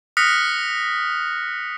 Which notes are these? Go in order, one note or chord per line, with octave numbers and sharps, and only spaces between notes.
D#6 F6 F#6 A#6 B6 C#7